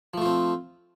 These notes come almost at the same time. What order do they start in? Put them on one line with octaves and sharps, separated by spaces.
F3 A3 F4 C4